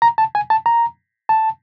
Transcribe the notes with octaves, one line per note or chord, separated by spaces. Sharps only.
A#5
A5
G#5
A5
A#5
A5